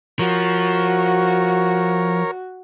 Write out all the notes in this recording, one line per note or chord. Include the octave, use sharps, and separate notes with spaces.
F3 F#4 A#4 C#5